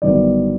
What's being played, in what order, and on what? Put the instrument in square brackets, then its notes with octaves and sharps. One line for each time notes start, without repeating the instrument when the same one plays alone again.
[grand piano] G1 G2 D#3 F#3 B3 D5